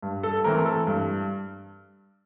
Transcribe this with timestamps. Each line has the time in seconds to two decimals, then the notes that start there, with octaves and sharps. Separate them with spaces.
0.03 G2
0.23 A4
0.44 E3 A3 C4 A#4
0.66 A4
0.87 G2